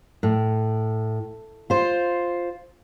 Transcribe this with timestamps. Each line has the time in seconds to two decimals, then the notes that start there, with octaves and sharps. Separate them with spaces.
0.23 A2
1.70 F4 C5